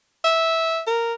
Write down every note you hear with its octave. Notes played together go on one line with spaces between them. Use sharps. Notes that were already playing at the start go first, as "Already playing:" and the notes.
E5
A#4